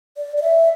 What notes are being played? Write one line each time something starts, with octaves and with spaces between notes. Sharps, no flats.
D5
D5
E5